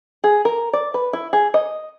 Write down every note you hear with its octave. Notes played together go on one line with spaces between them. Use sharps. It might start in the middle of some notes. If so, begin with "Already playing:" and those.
G#4
A#4
D5
B4
E4
G#4
D#5